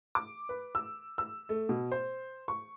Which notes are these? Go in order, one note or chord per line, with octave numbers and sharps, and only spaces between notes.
D6
B4
E6
E6
A3
B2
C5
C#6